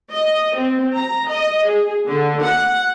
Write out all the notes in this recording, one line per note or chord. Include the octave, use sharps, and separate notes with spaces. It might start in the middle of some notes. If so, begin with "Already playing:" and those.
D#5
C4
A#5
D#5
G#4
D3
F#5